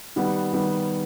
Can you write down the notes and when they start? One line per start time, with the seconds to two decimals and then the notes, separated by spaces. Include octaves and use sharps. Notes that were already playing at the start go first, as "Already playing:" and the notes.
0.16 D#3 G3 B3
0.53 D#3 G3 B3